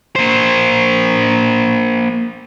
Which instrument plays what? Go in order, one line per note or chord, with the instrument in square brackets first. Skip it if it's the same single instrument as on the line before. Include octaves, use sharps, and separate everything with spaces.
[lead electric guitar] A#3 C5